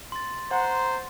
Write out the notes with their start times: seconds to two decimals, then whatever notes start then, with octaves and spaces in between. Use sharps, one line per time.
0.12 C6 A6
0.51 C5 F#5 A#5 C6